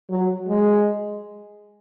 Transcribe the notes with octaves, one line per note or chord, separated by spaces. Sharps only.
F#3
G#3